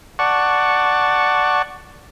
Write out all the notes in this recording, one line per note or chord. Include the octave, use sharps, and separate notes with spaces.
D5 F#5 A5 C#6